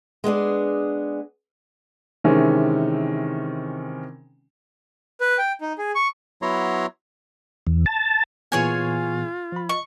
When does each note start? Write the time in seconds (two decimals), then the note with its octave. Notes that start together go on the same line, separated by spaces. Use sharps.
0.24 G#3 B3 D4 G#4
2.24 C3 D#3 E3 G#3 C4 C#4
5.21 B4
5.38 G5
5.61 D#4
5.78 G#4
5.95 C#6
6.42 F#3 B3 E4 C#5 A#5 C6
7.67 E2
7.86 A5
8.52 A#2 E3 B3 F4 G#4 C#5 G#5
9.52 F3 B5
9.69 D#5 C#6